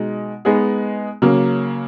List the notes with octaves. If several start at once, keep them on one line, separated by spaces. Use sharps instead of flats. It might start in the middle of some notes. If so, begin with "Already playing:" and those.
Already playing: B2 G#3 D#4
G#3 B3 D#4 G#4
C#3 F#3 A#3